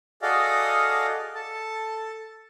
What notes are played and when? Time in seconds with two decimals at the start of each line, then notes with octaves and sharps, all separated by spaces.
0.22 F#4 G#4 A4 D5 D#5 F5
1.35 A4 A5